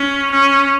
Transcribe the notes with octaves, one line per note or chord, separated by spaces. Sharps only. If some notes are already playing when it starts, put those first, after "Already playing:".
Already playing: C#4
C#4